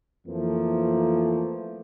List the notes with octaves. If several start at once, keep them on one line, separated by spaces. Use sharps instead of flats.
F2 E3 F3 A3 A#3